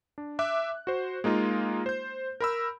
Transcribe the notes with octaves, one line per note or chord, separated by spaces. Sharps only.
D4
E5 D6 F#6
F#4 C5
G#3 A#3 D#4 F4
C5 G6
A#4 B5 E6